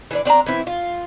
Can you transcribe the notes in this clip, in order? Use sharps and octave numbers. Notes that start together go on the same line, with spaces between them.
E3 D4 D5
C4 D4 G5 A#5
E3 C4 E4
F4